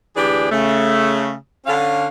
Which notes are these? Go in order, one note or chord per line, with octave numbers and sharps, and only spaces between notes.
D2 E3 D4 G4 G#4 D5
C#3 A3
D3 C#4 F5